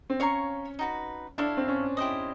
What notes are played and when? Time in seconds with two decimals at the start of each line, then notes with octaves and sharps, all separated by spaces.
0.10 C4
0.20 C#4 C#5 F5 A#5 C#6
0.79 D#4 F#4 B4
1.38 D4 E4 A4 C#5 F5
1.57 C4
1.68 C#4
1.97 E4 G4 C5 D#5